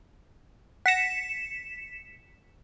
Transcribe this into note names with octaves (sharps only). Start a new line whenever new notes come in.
F#5 A#6 B6 C#7 E7